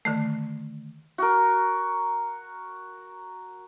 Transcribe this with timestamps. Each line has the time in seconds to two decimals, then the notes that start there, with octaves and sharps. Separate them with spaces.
0.05 D3 D#3 A3
1.18 F#4 A#4